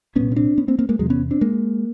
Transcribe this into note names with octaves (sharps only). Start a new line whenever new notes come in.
C2 A#2 B3 C#4
C#4
C4 D4
B3 C#4
A#3 C4
A#3 C4
G#3 A#3
E2 C3 F#3 G#3
B3 C#4
C4 D4
G#3 A#3